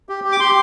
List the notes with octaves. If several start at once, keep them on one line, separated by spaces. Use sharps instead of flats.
G4
G4
D6
G4 C6